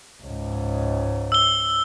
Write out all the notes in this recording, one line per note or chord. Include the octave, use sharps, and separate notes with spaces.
C#2 G#2
E6 G7